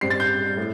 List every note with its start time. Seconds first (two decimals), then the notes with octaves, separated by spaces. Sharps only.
0.01 G2 G3 C4 C7
0.10 A6
0.20 G6
0.57 A2